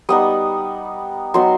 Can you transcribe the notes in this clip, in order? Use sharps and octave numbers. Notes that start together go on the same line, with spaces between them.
G3 B3 D#4 D#6
F#3 B3 D#4 C6